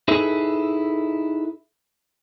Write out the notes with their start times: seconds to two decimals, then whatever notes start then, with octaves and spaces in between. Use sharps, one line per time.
0.08 D#4 E4 G#4 A4 B4